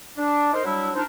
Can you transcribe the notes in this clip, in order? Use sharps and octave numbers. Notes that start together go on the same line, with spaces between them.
D4
D#4 A#4 C5
F#3 G3 D4 E4
F3 D4 D#4 A#4 C5